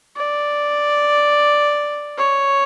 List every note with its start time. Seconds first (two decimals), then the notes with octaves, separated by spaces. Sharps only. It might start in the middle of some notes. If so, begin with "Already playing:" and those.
0.16 D5
2.17 C#5